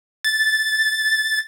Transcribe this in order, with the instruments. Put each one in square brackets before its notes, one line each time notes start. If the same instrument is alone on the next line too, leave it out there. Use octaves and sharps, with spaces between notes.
[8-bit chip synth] A6